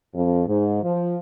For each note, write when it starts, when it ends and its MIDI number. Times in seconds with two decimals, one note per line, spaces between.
0.15 0.42 41
0.47 0.81 44
0.83 1.17 53